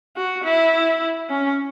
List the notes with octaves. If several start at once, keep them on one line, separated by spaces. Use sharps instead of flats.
F#4
E4
C#4